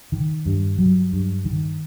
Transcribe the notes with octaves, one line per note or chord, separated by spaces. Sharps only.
D#3
G2
F#3
G2
D#3